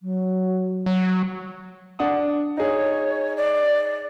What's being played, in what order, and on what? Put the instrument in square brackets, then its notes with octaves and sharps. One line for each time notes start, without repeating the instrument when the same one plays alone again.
[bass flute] F#3
[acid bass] F#3
[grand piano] D4 F#5 D#6
[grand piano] D#4 G#4 [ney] C#5
[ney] D5